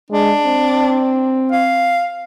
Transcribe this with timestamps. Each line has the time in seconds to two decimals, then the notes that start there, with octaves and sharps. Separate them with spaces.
0.10 G#3 D4
0.46 C4
1.52 F5